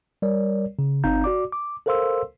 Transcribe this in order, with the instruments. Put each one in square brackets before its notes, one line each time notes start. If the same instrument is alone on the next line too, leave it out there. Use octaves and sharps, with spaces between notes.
[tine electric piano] G3 A#4 C#5 D5
C#3
G1 C4 D#4 F5 A#5 G6
F#4 D5 D6
D6
A4 A#4 C5 F5 C6 E6